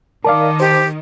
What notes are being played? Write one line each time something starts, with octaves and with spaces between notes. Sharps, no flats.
D#3 A#4 D5 F5 A5 D6
G4 C5